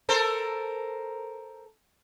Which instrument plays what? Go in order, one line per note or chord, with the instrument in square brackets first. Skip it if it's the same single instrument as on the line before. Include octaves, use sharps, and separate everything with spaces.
[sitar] A4 A#4 C5